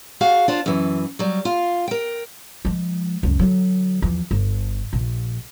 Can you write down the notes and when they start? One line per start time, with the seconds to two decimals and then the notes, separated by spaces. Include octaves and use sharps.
0.21 F#4 G#4 F5
0.48 D4 F4 C5
0.66 F#2 E3
1.19 F#3 G3
1.45 F4 F5
1.88 A#4 G5
2.65 F3 G#3
3.23 C#2 F#2
3.39 D3 F#3
4.02 E2 F3
4.31 G1
4.93 A#1